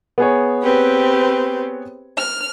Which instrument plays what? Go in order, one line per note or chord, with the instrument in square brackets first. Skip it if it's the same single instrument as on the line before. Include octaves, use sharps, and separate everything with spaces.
[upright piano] B3 G#4 C#5
[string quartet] C4 G4 B4
F6